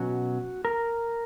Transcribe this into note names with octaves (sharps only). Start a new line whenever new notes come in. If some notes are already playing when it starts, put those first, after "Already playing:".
Already playing: B2 F#3 C#4 F#4
A#4